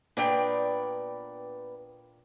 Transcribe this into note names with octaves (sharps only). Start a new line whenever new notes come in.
A#2 B3 D4 B4 D5 G5